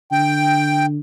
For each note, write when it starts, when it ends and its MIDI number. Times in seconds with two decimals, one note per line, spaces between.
0.12 1.00 50
0.12 0.86 79